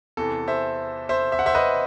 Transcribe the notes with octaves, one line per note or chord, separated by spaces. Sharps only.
E2 C3 E3 A4
C5 E5
C5 E5
E5
F#5
C5 E5
B4 D#5